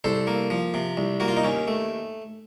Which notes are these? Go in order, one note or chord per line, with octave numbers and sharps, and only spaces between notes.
C2 A4 C5
A#3
F3
C3
C2
A#3 F#4
F4
D#4
D#2 C#4
A3